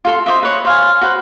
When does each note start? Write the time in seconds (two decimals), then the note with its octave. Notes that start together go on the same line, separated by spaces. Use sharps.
0.05 F4 A4 C6
0.26 C5 C#5 D#5 E5
0.43 B4 C#5 D#5
0.65 C5 F5 G#5
1.01 F#4 B4 C5